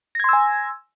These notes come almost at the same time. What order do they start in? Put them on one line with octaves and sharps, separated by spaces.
A#6 G#6 C6 E6 G#5